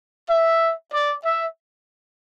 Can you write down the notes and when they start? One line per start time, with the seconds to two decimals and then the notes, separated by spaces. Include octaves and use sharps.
0.29 E5
0.92 D5
1.23 E5